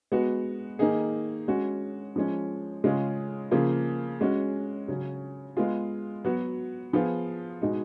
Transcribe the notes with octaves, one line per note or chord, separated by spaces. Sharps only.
G#3 B3 F#4
D#3 A#3 D#4 G#4
G#3 C#4 F#4
F3 G#3 C#4
C#3 G#3 C#4 F4 G#4
C#3 F3 A#3 F4 G#4
G#3 C#4 F#4
C#3 F#3 C#4
G#3 B3 F4 G#4
F#3 B3 F#4
F3 B3 F4 G#4
B2 G#3 D#4